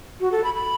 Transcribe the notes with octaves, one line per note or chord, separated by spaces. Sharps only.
F#4
A4
B5
B5